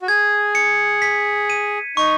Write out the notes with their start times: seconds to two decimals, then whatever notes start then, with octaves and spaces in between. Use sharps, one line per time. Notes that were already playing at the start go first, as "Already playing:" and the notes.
0.02 F#4
0.08 G#4 G#6
0.55 C#7
1.02 B6
1.50 D#7
1.97 D#4 C#6